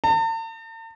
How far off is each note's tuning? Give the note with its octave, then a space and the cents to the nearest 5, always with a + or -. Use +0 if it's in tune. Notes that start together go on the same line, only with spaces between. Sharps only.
A5 +45